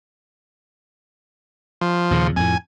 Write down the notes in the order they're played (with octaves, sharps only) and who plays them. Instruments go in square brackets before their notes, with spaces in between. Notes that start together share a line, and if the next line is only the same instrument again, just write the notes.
[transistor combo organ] F3
[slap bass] D#2 A#2 C#3
[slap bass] F2 A2 [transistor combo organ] G#5